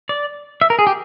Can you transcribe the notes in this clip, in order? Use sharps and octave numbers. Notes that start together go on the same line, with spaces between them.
D5
E5
A#4
G#4
G4